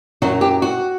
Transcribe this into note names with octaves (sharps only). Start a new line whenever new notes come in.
F#2 F#3 F#4
G4
F#4